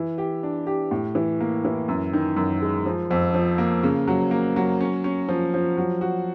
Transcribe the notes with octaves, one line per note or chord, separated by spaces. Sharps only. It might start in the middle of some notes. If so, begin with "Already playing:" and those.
Already playing: E3
G4
D4
G4
A2
E3
A#3
E3
F#2
D#3
F#2
G#3
F3
F2
F3
A#3
C#3
F#3
A#3
F#3
C#4
C#4
F3
F3
F#3
F#4